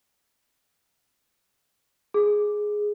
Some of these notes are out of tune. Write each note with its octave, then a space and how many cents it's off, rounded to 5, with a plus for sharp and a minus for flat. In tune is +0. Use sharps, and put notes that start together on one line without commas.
G#4 +5